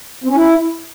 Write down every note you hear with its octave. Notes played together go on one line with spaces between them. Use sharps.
C4
C#4
E4